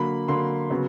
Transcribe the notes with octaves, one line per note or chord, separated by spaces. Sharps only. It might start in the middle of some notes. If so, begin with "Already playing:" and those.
Already playing: D3 F#3 A#3 B5
D3 F#3 A#3 C6
C#3 F#3 B3